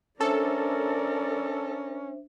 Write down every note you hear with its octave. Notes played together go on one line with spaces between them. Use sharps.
C#4 D4 A4 A#4 C5 D5 E5